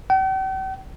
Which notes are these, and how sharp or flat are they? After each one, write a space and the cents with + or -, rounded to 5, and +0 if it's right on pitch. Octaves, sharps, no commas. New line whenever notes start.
G5 -45